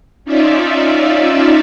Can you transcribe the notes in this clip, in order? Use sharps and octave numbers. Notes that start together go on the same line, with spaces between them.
C#4 D#4 F4 D5 E5